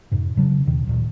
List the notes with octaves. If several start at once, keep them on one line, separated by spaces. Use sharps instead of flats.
F2 G#2 C3
C#3 F#3 G3 D4
D#2 B2 D#3
D1 A#2